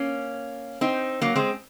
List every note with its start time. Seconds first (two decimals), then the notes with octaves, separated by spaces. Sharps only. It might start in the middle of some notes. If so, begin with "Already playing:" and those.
Already playing: A#3 C#4
0.81 C4 D#4
1.22 F#3 A#3
1.35 G#3 C4